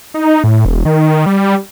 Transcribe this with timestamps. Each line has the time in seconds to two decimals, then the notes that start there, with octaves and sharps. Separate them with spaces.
0.14 D#4
0.44 A2
0.65 E1
0.85 D#3
1.26 G3